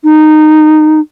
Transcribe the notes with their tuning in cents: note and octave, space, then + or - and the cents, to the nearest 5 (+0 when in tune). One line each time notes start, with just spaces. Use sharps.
D#4 -15